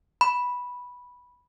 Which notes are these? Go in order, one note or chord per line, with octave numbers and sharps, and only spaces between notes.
B5